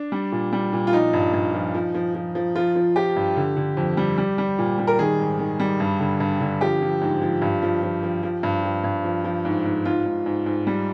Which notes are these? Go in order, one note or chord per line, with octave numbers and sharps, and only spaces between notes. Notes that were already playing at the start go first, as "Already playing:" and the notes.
Already playing: D4
G3
A#2
G3
A#2
F4
F3 D#4
G2
G2
F3
F3
F3
F3
F3
F3 F4
F3
F3 G4
G2
D3
D3
F2
G3
G3
G3
A#2
G3
A#4
D#3 G#4
G#2
D#3
G3
G2
D3
G2
D3
F3 G4
F3
G#2
F3
G2
F3
F3
F3
F3
G2
F3
G2
F3
F3
G#2
G#2
G#2 F4
G#2
G#2
G#2
G3